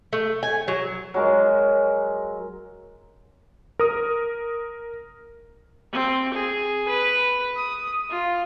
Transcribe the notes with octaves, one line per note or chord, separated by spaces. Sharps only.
A3
G#5
F#3
F#3 G#3 A#4
A#4 D#6
C4
G#4
B4
D#6
F4